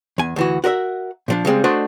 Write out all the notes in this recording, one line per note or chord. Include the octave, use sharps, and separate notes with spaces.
E2 G#5
D2 E3 F#4
F#4 A#4 D#5 E5
A#2 F3 D4
C#3 G3 G#3 C4
A3 D4 F#4 C5 D#5